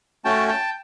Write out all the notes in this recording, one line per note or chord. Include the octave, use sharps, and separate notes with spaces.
A3 C#4 F#4 G5 A5
G5 A5